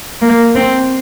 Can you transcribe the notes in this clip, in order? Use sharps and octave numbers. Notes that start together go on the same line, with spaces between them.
A#3
C4